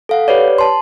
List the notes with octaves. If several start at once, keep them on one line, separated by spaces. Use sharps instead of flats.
A4 F5 F#5
G4 B4 C#5 D5
A5 C6